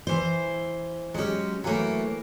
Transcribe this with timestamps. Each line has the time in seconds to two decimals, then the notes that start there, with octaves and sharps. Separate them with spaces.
0.07 E3 C5
1.14 F#3 G#3 C#4 G4
1.64 E3 F#3 A3 A#3